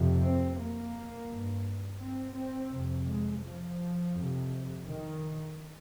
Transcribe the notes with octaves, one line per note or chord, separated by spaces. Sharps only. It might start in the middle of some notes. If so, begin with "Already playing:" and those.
Already playing: F2 C3
C4
A#3
G2
C4
C4
F2 C3
G#3
F3
F2 C3
D#3